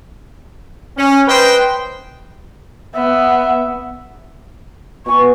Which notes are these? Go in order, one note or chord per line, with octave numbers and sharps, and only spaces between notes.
C#4
B4 C5 D#5 G5
B3 E5
B2 G#5 C#6